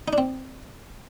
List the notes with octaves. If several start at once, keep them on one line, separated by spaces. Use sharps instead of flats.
D#4
D4
C4